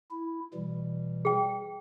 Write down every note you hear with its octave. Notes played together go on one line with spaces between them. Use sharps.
E4
B2 E3 G3
G#4 G5